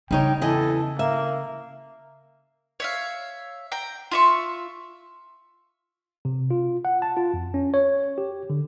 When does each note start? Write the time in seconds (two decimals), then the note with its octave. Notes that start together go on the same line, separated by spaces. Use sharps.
0.11 C#3 G3 D#4 C#5 G5
0.41 E2 E3 A4 D#5
0.99 A#3 E5
2.80 C#5 E5 F5
3.72 G5 A#5
4.11 F4 E5 C#6
6.25 C3
6.51 F4
6.85 F#5
7.02 A5
7.17 F4
7.34 F2
7.54 C#4
7.74 C#5
8.18 G4
8.50 D3